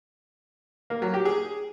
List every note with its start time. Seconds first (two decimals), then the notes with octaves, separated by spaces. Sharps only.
0.90 A#3
1.02 F#3
1.14 G4
1.25 G#4